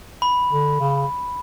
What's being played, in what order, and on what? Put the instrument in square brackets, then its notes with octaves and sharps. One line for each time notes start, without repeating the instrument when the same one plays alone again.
[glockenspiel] B5
[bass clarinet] D3
C#3